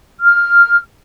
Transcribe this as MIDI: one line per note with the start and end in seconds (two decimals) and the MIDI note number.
0.21 0.77 89